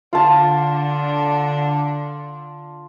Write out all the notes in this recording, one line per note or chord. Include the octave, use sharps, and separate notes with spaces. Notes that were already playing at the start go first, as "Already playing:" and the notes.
D3 D4 F4 A5